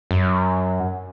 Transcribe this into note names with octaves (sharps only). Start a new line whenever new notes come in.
F#2